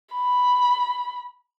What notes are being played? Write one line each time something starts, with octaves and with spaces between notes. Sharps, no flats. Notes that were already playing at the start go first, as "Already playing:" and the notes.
B5